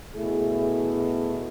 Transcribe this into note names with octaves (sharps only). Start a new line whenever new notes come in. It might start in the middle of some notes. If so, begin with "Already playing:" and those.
B2 A3 E4 G#4